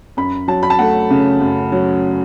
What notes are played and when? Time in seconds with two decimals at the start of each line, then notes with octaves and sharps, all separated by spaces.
0.17 F#2 B5
0.48 F#3 A5
0.63 B5
0.70 A5
0.79 A3 F#5
1.10 C#3
1.41 F#2
1.72 F#3